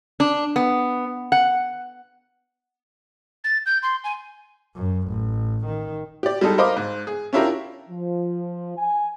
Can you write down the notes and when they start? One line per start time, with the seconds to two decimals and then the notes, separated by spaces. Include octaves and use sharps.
0.20 D4
0.56 B3
1.32 F#5
3.44 A6
3.66 G6
3.83 C6
4.04 G#5
4.76 F#2
5.08 A1
5.65 D#3
6.23 G4 D5
6.41 G3 G#3 D#4 A4
6.58 A#4 C5 D#5 F5 B5 D6
6.77 G#2
7.07 G#4
7.33 C#4 D4 E4 F4 G4 A#4
7.89 F3
8.76 G#5